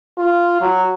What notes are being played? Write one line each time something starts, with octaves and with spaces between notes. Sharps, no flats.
F4
F#3